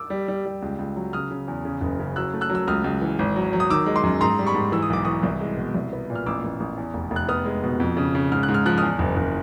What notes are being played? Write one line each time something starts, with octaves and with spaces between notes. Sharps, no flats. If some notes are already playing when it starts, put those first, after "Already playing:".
Already playing: D6 E6
G3
G3
G3
C#2
C#2
F#3
C#3 D#6 F6
C#3
E2
C#3
F#1
C#3
F#3 E6 F#6
A3
E6 F#6
F#3
E6
C#2 D#6 F6
C#2
E3
G#1
F#3
F#3
D#6
D#3 D6 E6
G#3
C6 D6
F#2
G#2 A#5 C6
G3
B5 C#6
G#2
E3 E6
D#6
B1 D6
E3 C#6 D#6
C2
G#3
B2
C2
B3
A#2
F6
A1 D6 E6
A1
A1
E2
F1
F1
F#6
B3 D#6 F6
G#3
B2
F2
C#3
C#3
G#2 F6
F#6
G#2
F6
F3 F#6
E2 D#6 F6
F#1
F#1